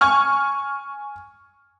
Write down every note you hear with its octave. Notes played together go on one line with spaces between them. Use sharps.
G#5 C#6 F6